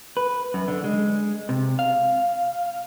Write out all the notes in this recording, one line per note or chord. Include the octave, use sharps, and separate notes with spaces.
B4
F#2
D3
G#3
C3
F5